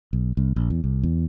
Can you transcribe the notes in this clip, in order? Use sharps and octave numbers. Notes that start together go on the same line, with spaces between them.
B1
C2
A#1
E2
C2
E2